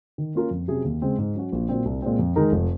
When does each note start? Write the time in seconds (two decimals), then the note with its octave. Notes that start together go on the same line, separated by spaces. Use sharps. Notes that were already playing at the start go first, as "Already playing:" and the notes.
0.18 D#3
0.35 A#3 C#4 F4 A#4
0.51 F2
0.68 C3 F#3 C#4 G#4
0.85 D#2
1.02 C#3 G#3 C4
1.18 G#2
1.35 F#3 C#4 F#4
1.52 A#1
1.69 A#2 F#3 C4
1.85 C2
2.02 A#2 G#3 C4
2.19 F2
2.36 D#3 G#3 D#4 A#4
2.52 F1